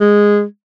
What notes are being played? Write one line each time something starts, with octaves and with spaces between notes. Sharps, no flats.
G#3